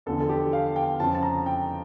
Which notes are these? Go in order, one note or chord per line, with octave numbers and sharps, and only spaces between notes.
E2 D3 F3 A4
A4
G4
F5
G5
F2 C#3 F3 A5
A5
A#5
G5